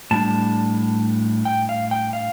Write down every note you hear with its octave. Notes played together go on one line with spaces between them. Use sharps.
A2 G3 D4 A5
G5
F5
G5
F5